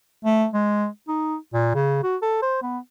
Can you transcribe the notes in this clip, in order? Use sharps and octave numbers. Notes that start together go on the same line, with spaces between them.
A3
G#3
D#4
A#2
C#3
F#4
A4
C5
B3